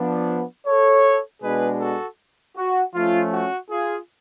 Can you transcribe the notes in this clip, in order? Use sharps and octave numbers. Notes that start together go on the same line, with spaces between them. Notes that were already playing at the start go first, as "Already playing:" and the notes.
Already playing: F3 B3 D4
A4 C#5
B2 G#3 D4 G#4 B4
F#4 A4
F#4
F3 A3 C#4 F4
F#4
F4 G#4